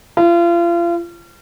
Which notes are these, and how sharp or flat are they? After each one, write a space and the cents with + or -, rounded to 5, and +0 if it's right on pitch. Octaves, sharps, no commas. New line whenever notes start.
F4 -35